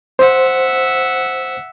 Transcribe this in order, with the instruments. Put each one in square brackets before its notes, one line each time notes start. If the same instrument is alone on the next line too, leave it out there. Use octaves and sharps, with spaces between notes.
[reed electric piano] C5 [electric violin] E5 F#5